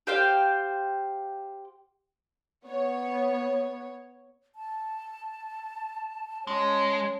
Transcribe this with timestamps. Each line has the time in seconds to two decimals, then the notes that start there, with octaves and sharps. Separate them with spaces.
0.07 G4 C5 F5 G5
2.68 B3 C#5
4.55 A5
6.47 G#3 C#4